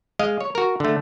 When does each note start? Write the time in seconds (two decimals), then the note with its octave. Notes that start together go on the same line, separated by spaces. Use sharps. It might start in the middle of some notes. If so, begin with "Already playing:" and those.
0.19 G#3 D#5 F5
0.41 C#5
0.55 F#4 A#4
0.80 D3 A3